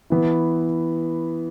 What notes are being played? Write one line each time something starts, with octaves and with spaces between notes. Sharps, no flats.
E3 B3 E4